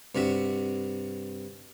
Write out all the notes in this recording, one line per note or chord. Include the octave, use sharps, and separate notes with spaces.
G2 C3 F#4 E5